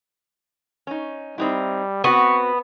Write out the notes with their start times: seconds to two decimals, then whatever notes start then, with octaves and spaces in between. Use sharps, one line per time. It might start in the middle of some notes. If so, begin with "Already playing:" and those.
0.87 C#4 D#4
1.38 G3 C4 D#4 E4
2.04 B3 C4 F#4 C#6